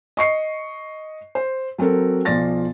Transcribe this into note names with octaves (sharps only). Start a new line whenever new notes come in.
D#5 C#6 C7 C#7
C5
F#3 C4 F#4 A4 A#4
B1 F3 F4 D5 A6 A#6